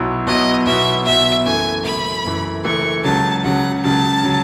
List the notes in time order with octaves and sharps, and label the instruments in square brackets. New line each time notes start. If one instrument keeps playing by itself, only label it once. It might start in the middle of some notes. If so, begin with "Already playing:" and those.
Already playing: [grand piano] B1 B2 F#3 B3 E4
[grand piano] B1 B2 F#3 B3 E4 [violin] D#5
[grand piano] B1 B2 F#3 B3 E4 [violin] E5
[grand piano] B1 B2 F#3 B3 E4 [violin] E5
[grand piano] F#1 F#2 E3 A3 [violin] G#5
[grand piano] F#1 F#2 E3 A3 [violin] B5
[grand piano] F#1 F#2 E3 A3
[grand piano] F#1 F#2 E3 A3 [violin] C#6
[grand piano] C#2 C#3 F#3 [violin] A5
[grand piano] C#2 C#3 F#3 [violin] F#5
[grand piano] C#2 C#3 F#3 [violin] A5
[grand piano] C#3 F#3